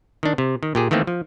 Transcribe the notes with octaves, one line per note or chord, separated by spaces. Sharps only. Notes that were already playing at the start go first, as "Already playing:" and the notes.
D#3 D4
C3
D#3
A#2 G4 G#4
D#3 E3 A3 A#3 C4
F3